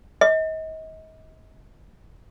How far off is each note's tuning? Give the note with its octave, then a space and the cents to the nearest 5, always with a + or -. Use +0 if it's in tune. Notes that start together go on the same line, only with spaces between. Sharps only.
D#5 +35